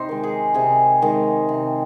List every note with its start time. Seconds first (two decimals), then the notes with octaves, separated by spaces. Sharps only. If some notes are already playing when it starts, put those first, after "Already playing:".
Already playing: C3 D#4 C5
0.09 D#3 G#3
0.23 G#4
0.54 C3 G#4
1.02 D#3 G#3
1.49 C3